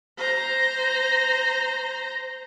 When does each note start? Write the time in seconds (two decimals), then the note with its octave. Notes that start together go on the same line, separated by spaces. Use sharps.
0.18 C5 A#5